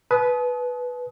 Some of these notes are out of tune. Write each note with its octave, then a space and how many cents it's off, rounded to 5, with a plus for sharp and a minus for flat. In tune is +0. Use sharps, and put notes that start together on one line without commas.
B4 +0 A5 -40 D#6 +25